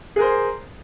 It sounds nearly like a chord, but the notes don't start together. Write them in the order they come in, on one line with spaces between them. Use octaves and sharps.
G#4 A#4 C5